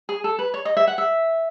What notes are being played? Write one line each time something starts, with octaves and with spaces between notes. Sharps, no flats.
G#4
A4
B4
C#5
D#5
E5
F#5
E5